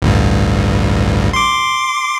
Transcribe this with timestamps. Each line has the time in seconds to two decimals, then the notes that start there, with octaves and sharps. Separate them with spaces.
0.02 A1 D2 G2
1.33 C6 D6